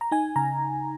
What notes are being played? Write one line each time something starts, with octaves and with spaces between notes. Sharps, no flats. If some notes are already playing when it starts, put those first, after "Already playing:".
A#5
D#4 G#5
C#3 A#5